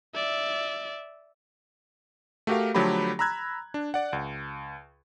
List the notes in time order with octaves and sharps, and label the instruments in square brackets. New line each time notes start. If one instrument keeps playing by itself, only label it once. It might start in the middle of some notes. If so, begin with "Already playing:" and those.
[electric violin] D5 E5
[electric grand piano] A3 F#4 G4 A#4 F5
D3 F3 F#3 A3 G4 B5
A#5 B5 E6 F#6 G#6
D4
D5 F#5
C#2